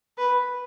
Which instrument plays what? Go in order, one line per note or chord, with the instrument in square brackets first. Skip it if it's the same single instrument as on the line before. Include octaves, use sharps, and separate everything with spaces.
[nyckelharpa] B4